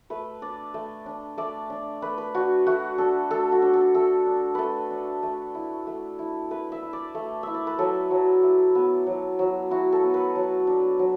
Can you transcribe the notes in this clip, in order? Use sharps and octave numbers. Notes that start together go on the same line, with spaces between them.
A3 B4
D4 D5
A3
D4
A3 D5
D4
A3 B4
B4
D4 F#4
A3 F#4
D4 A4
A3 A4
F#4
D4
A4
A3 A4
D4
A3 A4 B4
D4
A3
E4
A3
E4
A3 B4
E5
E4
D5
A3
E4 E5
D5
B4
F#3 A4
F#3
E4
B3
F#3
F#3
E4 F#4
A4
B3
B4
F#3
D4
F#3